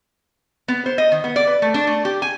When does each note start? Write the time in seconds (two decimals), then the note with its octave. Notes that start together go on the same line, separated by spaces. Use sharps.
0.68 B3
0.86 C5
0.98 D#5
1.12 D#3
1.24 B3
1.36 D5
1.47 B4
1.62 A3
1.74 D4
1.87 A3
2.05 G4
2.22 G#5